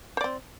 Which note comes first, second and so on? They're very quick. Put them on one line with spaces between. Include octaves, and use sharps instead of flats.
C5 D5 C4